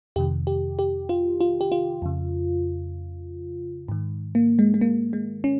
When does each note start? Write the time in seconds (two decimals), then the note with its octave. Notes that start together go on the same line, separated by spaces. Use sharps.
0.16 F2 C3 D#3 G4
0.47 G4
0.79 G4
1.09 F4
1.41 F4
1.61 G4
1.72 F4
2.02 F2 C#3
3.88 G#2 D#3
4.35 A#3
4.59 G#3
4.74 G#3
4.81 A#3
5.13 G#3
5.44 C#4